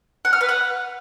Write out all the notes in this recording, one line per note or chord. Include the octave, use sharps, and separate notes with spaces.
F#5
F6
B4
F#5